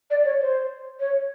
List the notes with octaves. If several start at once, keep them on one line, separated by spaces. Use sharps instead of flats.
D5
C#5
C5
C#5